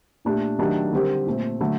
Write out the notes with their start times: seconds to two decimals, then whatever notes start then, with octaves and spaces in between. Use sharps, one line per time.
0.25 A#2 A3 D4 G4
0.59 D#3 F#3 A3 D4 G4
0.93 D3 G3 C4 G4 A#4
1.26 A#2 A3 C4
1.60 D3 F#3 A3